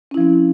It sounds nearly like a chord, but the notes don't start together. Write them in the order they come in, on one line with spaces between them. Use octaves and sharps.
C#4 E4 F3 C4